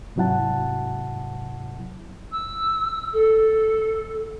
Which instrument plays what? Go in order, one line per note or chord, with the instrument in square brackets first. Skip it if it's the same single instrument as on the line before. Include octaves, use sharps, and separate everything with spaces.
[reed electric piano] G#2 C3 F#3 E4 F#5 A5
[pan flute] E6
A4